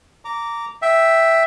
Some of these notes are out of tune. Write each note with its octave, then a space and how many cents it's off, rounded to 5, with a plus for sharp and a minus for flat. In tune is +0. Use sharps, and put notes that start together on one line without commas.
A#5 -10 D6 -15
E5 +0 G5 +0